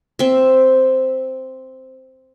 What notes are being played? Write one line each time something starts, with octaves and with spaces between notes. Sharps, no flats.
C4 E5